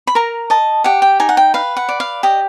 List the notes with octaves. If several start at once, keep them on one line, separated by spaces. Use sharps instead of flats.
B5
A#4 A#5
D#5 A5
G4 F#5
G5
D#4 G#5
F#5
G5
B4 F5
F#5
D5
F5
G4 D#5